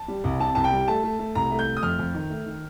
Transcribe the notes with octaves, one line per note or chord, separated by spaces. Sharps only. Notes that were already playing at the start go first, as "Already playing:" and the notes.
Already playing: A5
G3
C2
C3 A5
C2 A5
G5
G3
A3 A5
A3
A3
C2 A#5
A3
G6
A3
D#6
F2 F6
F2
D#3
A3
D#3